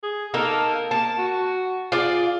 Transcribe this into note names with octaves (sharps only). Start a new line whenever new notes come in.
G#4
A#3 D#4 A4 A#4
A#3 A5
F#4
F4 G#4 D5